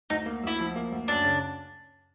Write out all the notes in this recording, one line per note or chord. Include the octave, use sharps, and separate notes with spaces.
D2 D#4
A#3
D2 E4
F3
A#3
D2
F#2 D4
C#3